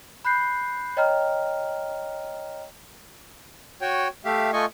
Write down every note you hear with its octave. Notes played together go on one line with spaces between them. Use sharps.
B5 F#6 G6 C7
C#5 D#5 G5 A#5 F6
F#4 C#5 G5
A3 G4 E5 F5
A3 F4 D#5 G#5 C#6